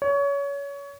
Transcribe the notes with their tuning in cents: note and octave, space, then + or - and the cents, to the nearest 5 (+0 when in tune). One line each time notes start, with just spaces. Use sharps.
C#5 +25